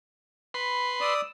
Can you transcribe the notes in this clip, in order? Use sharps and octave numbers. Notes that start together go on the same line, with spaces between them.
B4 B5 C6
D5 D#6 E6